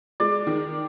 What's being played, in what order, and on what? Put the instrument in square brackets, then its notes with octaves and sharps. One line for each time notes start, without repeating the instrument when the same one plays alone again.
[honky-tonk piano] G#3 [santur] D5
[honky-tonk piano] D#3